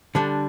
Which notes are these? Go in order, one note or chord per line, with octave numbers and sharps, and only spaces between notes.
D3 G3 D4